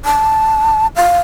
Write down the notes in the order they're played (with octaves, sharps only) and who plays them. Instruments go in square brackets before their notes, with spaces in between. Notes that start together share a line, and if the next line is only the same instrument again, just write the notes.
[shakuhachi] A5
F5